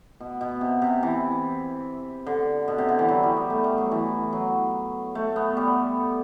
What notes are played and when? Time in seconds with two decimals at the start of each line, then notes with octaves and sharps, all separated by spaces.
0.20 B2
0.41 B2
0.61 C3
0.82 C3
1.03 E3
2.26 D3
2.68 B2
2.78 C3
2.89 D3
2.99 E3
3.08 F#3
3.23 G3
3.37 B3
3.50 A3
3.64 G3
3.78 F#3
3.91 E3
4.33 F#3
5.15 A3
5.36 B3
5.57 G3